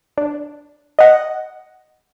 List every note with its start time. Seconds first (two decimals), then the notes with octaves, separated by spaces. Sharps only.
0.17 D4
0.99 D#5 F#5